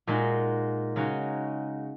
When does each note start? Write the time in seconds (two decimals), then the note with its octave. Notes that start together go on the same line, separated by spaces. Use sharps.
0.07 A#2 G#3 D#4 F#4
0.96 C#3 G#3 D#4 F#4